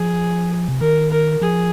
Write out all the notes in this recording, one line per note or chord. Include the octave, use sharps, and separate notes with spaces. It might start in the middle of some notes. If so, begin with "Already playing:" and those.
Already playing: F3 G#4
C3
D#3 A#4
A#4
F3 G#4